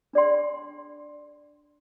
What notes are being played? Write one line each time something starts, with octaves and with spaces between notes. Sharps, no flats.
D4 G#4 D5 G5 C6